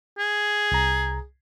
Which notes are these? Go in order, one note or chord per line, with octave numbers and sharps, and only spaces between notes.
G#4
C2 A#5